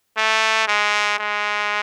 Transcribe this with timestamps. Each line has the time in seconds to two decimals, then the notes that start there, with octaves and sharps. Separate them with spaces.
0.17 A3
0.68 G#3
1.19 G#3